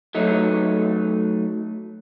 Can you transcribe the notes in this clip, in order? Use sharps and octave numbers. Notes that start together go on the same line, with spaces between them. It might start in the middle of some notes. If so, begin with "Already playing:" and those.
F#3 A3 D#4